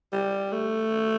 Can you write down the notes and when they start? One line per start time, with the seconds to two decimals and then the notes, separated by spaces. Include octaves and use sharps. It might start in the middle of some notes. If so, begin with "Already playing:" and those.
0.13 G3
0.52 A3